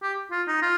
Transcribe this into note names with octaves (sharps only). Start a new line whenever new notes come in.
G4
F4
D#4
F4